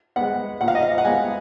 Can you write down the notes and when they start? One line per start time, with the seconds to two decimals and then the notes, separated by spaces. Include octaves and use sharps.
0.16 G#3 B3 F#5
0.61 A#2 F#5
0.68 F5
0.75 D#5
0.82 F5
0.98 F#5
1.05 G#3 B3 G#5